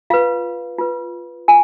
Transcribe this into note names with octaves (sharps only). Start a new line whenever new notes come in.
F4 B4 F5
F4 B4
F4 G#5